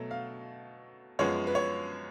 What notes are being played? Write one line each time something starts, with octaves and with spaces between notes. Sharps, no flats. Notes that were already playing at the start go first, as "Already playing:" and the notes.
Already playing: B2 F#3 A3
F5
F#2 F3 G#3 B3 C#5
B4
C#5